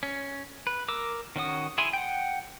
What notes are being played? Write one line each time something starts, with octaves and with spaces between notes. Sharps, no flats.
C#4
B4
A#4 D6 E6
D#3 C#4 F#4 D#6
E4 G#4 G#5 C6
F#5 G5